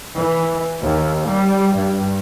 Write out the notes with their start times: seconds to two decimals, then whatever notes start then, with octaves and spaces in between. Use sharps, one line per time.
0.16 E3
0.82 D#2
1.28 G3
1.75 G2